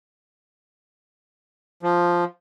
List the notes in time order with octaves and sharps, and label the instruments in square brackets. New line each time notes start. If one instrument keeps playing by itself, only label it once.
[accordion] F3